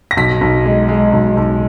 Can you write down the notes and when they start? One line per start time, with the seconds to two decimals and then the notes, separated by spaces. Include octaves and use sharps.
0.11 A#6
0.17 B1 B6
0.41 B1
0.66 G#3
0.89 G#3
1.13 B1
1.37 B1